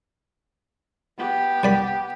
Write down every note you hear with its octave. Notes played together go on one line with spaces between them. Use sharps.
B3 G4
C2 D5 B5